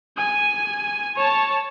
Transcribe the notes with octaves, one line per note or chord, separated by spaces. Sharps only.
G#5
C#5 A5